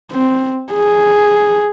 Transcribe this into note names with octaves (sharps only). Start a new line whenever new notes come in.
C4
G#4